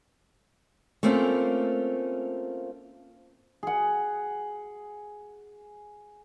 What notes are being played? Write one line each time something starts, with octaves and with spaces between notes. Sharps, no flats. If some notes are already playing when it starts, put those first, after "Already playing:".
A3 A#3 C4 C#4 F4
G#4 F#5